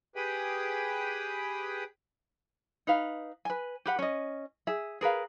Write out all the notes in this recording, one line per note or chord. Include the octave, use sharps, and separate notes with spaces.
G4 G#4 B4 G5 B5 D#6
D#4 B4 F5
B4 G#5
G4 B4 F#5
C#4 D#5
G#4 E5
G#4 A#4 B4 F5